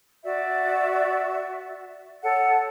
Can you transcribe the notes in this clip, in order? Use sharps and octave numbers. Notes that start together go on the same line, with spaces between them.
F#4 D5 E5
A4 C#5 F#5